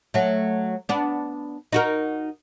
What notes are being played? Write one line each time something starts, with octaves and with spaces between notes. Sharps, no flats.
F#3 A3
B3 D4
D#4 F#4 A#4